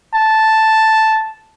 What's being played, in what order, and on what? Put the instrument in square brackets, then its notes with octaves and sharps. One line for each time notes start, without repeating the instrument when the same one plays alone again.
[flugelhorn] A5